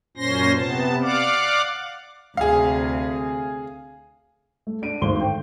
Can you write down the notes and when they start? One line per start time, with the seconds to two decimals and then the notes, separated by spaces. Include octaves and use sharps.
0.17 F#2 A#2 C#4 C5 C6 A#6
0.54 C3 B3 A5
1.02 D5 F5 F#5 D6
2.37 D2 C3 G#4 F5
4.67 A3
4.82 D4 D7 D#7
5.01 G#1 D2 C6 G7
5.21 G5